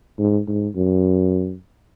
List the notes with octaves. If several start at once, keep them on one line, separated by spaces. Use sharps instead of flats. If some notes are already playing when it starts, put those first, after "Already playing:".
G#2
G#2
F#2